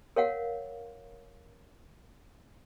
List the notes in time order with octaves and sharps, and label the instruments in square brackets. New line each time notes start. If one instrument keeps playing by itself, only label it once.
[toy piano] A#4 C#5 F5 F#5